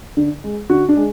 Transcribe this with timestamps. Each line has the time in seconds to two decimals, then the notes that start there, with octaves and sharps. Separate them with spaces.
0.17 D3
0.44 G#3
0.70 D3 F#4
0.89 D4
0.97 G#3